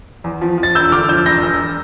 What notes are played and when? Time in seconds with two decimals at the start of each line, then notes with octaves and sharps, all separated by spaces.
0.24 E2
0.41 F3
0.58 F3
0.63 A6
0.75 E1 E6 G6
0.92 D3 D6 F6
1.09 F3 E6 G6
1.26 E1 G6 A#6
1.43 E1